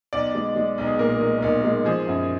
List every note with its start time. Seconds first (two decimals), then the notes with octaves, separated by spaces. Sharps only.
0.13 B1 D5
0.35 G#3
0.56 G#3
0.78 B1
0.87 G#4
0.99 A#2 A#4
1.21 G#3
1.42 B1
1.64 G#3
1.85 F3 G#4
2.07 F#2